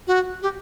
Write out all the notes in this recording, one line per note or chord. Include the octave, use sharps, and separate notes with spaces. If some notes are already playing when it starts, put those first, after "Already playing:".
F#4
G4